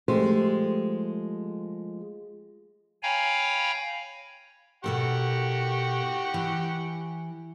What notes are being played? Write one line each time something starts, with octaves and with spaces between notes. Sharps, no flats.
F3 G#3 A3 G4 C5
C#5 F5 G5 G#5 A#5 B5
B2 G4 A4 A#4 F#5 C#6
E3